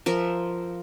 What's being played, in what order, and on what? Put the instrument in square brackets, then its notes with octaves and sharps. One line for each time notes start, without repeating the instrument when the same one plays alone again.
[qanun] F3 A#4 E5